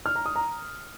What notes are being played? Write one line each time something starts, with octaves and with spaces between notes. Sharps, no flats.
F6
A#5
D#6
A#5